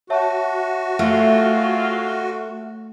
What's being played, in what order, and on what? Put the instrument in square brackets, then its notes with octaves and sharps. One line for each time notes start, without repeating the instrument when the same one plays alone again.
[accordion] F#4 [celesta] C#5 E5 A5
[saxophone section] G#3 C4 F4 [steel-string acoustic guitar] A3